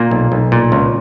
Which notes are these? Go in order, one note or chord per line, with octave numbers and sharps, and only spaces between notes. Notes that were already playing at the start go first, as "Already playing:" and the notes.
Already playing: A#2 A#3
B1
B1
A#2
C#2